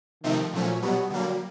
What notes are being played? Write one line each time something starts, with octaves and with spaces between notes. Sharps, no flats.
C3 D#3 F3 A3 C4 D#4
A#2 F3 F#3 A3 C#4
B2 F#3 G3 B3
D3 F#3 G3 A#3